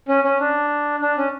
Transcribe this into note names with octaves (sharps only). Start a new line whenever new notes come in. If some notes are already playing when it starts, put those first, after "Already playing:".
C#4
C#4
D4
D4
C#4